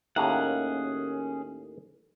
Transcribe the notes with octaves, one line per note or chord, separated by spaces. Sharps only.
D#2 A2 A#3 C#4 G#4 F#5